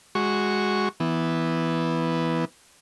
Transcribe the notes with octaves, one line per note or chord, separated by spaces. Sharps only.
G#3 F#4 C#6
E3 B3